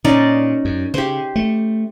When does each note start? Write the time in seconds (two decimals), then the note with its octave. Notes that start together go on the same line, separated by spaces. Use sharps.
0.05 A#2 C#4 D#4 D5
0.65 F#2
0.94 C#3 G4 C5
1.36 A3